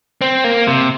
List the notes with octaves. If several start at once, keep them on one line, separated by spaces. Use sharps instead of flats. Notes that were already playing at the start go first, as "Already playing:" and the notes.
C4
A#3
C3